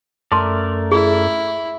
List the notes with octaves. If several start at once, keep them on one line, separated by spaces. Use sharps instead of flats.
F#2 A3 A#4 D5 A5 C6
E4 G#4